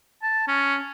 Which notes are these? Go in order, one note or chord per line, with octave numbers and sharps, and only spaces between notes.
A5
C#4